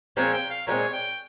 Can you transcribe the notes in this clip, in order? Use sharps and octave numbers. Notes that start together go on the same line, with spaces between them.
A#2 F3 G#3 C4 C#5
G5
F5
A#2 F3 G#3 C4 C#5
G5